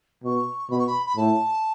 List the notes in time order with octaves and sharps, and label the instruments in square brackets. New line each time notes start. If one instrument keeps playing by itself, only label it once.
[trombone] B2 [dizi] C#6
[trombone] B2 [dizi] B5
[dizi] C#6
B5
B5
[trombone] A2 [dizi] A5